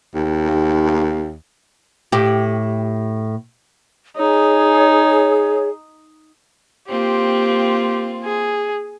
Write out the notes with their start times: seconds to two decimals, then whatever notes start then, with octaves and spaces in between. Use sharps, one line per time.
0.14 D#2
2.12 A2 G4
4.17 D#4 G#4 C#5
6.89 A#3 C4 F4 G4
8.24 G#4